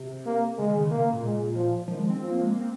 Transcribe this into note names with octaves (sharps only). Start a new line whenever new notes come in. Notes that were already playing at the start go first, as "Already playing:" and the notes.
Already playing: C3
A#3
C#3 G#3
D#3
C#3
C3 A#3
C#3
A#2
G#3
F3
D#3 F3
G#3
C4
F3 C4
A#3
G#3
A#3
C4